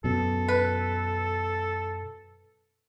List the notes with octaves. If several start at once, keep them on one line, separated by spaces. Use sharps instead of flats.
F#2 B2 A4
B4